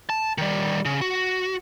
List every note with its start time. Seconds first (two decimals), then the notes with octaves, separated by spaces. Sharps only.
0.10 A5
0.38 D#3 G3
0.85 C#3
1.01 F#4